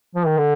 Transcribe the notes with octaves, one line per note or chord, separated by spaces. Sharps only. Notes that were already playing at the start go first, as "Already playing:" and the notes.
F3
D#3
D3